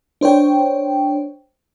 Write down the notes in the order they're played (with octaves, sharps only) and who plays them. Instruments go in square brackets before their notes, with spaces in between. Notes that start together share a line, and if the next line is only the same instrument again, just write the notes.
[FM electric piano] D4 C5 C#5 G5